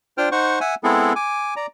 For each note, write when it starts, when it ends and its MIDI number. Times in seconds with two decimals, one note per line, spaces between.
0.18 0.29 62
0.18 0.29 65
0.18 0.29 72
0.18 0.29 79
0.18 0.29 89
0.32 0.59 63
0.32 0.59 72
0.32 0.59 78
0.32 0.59 85
0.60 0.75 76
0.60 0.75 78
0.60 0.75 80
0.84 1.13 56
0.84 1.13 59
0.84 1.13 60
0.84 1.13 64
0.84 1.13 68
0.84 1.13 69
1.16 1.54 80
1.16 1.54 86
1.56 1.66 74
1.56 1.66 82